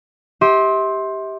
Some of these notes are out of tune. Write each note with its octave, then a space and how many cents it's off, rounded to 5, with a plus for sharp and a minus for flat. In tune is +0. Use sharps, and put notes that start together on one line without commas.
G4 +0 E5 -35 C6 +15